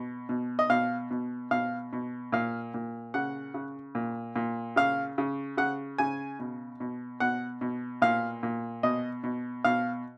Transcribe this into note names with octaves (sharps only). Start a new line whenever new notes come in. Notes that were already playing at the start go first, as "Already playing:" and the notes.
Already playing: B2
B2
D#5
B2 F5
B2
B2 F5
B2
A#2 F5
A#2
C#3 F#5
C#3
A#2
A#2
C#3 F5
C#3
C#3 F#5
C#3 G#5
B2
B2
B2 F#5
B2
A#2 F5
A#2
B2 D#5
B2
B2 F5